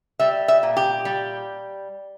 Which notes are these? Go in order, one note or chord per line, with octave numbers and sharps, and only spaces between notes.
G3 E5
E5
A#2
G4
G3